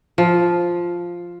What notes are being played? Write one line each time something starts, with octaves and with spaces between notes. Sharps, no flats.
F3